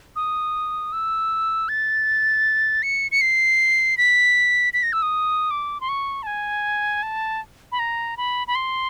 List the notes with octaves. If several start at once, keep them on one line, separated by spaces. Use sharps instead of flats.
D#6
E6
A6
C#7
C#7
C7
B6
B6
A#6
E6
D#6
D6
C6
C#6
A5
G#5
A5
B5
A#5
B5
B5
C6